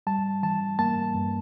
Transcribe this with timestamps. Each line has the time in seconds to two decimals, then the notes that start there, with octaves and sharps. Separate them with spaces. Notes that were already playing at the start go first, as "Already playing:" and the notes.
0.07 G3 A5
0.43 E3 A5
0.79 A#3 A5
1.15 G2